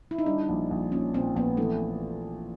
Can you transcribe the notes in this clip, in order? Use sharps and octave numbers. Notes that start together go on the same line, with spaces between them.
E4
D#4
G3 D4
A#1
A#1
A#2 C#4
A#2 C4
A#1 B3
E3 A3